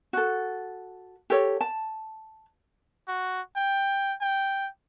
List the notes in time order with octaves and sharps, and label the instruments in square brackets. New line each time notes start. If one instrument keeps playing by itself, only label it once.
[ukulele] F#4 A4
G4 A4 C#5
A5
[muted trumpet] F#4
G5
G5